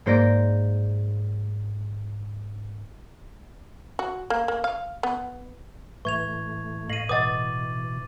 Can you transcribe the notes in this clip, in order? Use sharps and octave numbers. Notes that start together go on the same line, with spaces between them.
G#2 A#3 C5 D5 A#6 D7
F#4
A#3
A#3
F5
B3
A2 E3 A3 C#6 G#6 F7
A2 D#5 F5 D#7 F#7
B2 E3 D#5 F#5 D6 D#6 A6